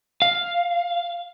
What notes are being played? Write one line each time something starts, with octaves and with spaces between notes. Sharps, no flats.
F5